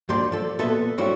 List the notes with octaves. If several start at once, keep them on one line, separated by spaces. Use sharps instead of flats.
G2 A#2 F3 G4 D5 C6
F3 A4
A#2 B3 A4 B4 E5
G2 F3 G3 C#4 E4 F#4